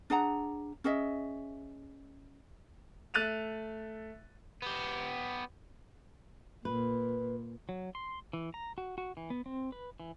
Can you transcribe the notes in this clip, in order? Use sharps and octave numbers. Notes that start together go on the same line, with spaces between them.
D4 G#4 F#5 A#5
C#4 G#4 D#5 E5
A3 F#6 A6 D#7 F7
B3 G4
A#2 B4
F#3
C6
E3
A#5
F#4
F#4
E3
B3
C4
B4
E3